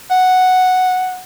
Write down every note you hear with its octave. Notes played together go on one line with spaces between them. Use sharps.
F#5